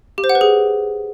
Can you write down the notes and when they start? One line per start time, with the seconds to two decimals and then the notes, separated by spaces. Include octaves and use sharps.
0.18 G4
0.24 C5
0.29 F#5
0.35 B4
0.41 G#4